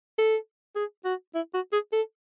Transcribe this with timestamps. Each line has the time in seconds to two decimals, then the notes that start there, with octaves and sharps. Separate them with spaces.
0.18 A4
0.76 G#4
1.05 F#4
1.35 E4
1.54 F#4
1.72 G#4
1.93 A4